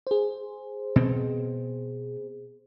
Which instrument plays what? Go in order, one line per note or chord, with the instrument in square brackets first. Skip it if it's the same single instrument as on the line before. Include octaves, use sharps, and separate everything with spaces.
[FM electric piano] G#4 C5
[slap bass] B2 C4